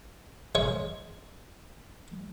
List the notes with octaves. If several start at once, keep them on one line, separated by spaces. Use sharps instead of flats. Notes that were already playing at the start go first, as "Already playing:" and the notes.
G#3 C#5 C#6